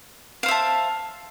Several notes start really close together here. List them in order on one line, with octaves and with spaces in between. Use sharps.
F5 C5 E5 A5